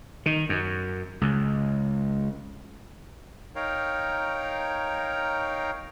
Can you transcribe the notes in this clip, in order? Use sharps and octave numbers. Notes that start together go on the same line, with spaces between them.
D#3
F#2
C#2
D#4 A#4 C#5 F5 G5 A#5